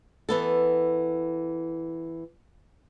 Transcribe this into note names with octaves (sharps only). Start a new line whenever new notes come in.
E3 B3 A4